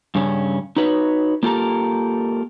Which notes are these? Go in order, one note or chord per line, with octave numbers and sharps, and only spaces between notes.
G2 C#3 C#4
D#4 F#4 B4 C#5
A#3 F4 G4 A4 A#4